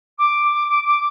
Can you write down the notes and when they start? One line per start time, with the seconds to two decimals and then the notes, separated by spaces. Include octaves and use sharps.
0.18 D6
0.51 D6
0.69 D6
0.86 D6